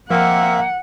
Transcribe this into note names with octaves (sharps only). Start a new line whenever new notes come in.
F3 A#3 C4 A#4 E5 F#5